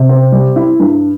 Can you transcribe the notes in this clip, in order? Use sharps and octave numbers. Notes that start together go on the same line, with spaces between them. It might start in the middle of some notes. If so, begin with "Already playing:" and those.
Already playing: C3
C4
G3
E4
G2